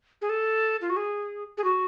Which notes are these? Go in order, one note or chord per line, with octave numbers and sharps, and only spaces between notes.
G#4
A4
F4
F#4
G#4
G#4
F#4